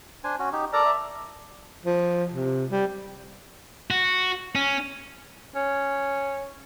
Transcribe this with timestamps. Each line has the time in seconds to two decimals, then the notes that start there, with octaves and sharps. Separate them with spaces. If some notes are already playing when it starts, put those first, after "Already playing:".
0.24 D4 C5 G#5
0.39 C#4 F#4
0.53 D#4 G4
0.73 A4 A#4 D5 A5 A#5
0.86 E5
1.85 F3
2.31 C3
2.71 G3
3.91 F#4
4.55 C#4
5.55 C#4